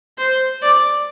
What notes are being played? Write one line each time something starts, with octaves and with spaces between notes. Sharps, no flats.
C5
D5